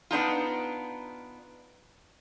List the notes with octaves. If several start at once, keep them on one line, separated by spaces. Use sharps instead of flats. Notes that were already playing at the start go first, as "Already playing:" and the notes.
B3 D4 D#4 F4